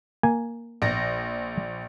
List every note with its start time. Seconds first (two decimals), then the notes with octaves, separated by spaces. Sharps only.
0.23 A#3 G#5
0.82 A#1 A#6